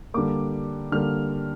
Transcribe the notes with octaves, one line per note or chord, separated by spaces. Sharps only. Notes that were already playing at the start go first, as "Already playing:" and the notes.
D3 G3 A#3 D6
D3 G3 A#3 F6